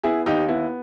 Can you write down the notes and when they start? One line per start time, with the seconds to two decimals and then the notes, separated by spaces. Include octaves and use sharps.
0.03 B3 E4 G#4
0.26 D#2 D#4 G4
0.48 B3 E4